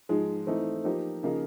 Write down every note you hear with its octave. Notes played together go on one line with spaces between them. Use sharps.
G#2 F3 G#3
E3 A3 C4 D#4
F3 A#3 D#4 G4 C5
C#3 F3 A#3 D#4